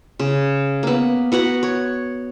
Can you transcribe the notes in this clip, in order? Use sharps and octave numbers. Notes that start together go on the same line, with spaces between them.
C#3
A#3 B3
B3 F#4 F#5 A#5
C#5